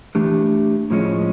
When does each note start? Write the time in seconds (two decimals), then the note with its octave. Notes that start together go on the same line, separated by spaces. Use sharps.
0.15 E3 A3 D4 G4
0.90 A2 F3 G#3 C#4